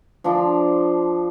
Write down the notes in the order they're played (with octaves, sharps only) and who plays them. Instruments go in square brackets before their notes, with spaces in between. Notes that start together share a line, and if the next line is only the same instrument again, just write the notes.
[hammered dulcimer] F3 D4 A#5 C6